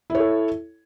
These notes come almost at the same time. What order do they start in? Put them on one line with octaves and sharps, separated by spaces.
E4 C#5 A4